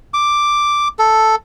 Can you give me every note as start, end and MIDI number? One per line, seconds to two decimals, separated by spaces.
0.14 0.88 86
0.99 1.35 69